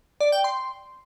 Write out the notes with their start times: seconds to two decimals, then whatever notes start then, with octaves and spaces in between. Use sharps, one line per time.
0.20 D5
0.32 G5
0.44 C6